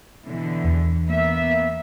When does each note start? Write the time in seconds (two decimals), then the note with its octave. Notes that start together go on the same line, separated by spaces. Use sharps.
0.24 B2 D3 E3
0.65 E2
1.05 A#3 B3 E5